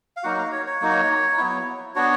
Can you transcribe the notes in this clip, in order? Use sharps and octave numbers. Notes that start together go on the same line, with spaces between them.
F5
F#3 A#3 D#4 F#4 F#5
F5
C#5
C#5
F#3 A#3 D#4 F#4
F#3 B3 E4
B3 D4 F#4 C#5